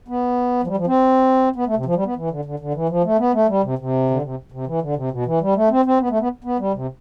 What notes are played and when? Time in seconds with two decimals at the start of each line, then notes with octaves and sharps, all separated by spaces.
0.08 B3
0.63 F3
0.67 G3
0.77 F3
0.87 C4
1.56 B3
1.66 A3
1.76 C3
1.86 F3
1.95 G3
2.05 B3
2.16 E3
2.30 D3
2.45 D3
2.60 D3
2.74 E3
2.89 F3
3.04 A3
3.19 B3
3.33 A3
3.48 G3
3.63 C3
3.79 C3
4.10 D3
4.22 C3
4.52 C3
4.66 E3
4.81 D3
4.96 C3
5.11 B2
5.26 E3
5.41 G3
5.55 A3
5.70 C4
5.85 C4
6.00 B3
6.10 A3
6.20 B3
6.44 B3
6.59 G3
6.73 C3